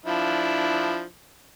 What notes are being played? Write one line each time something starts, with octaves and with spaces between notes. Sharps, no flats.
F3 D4 E4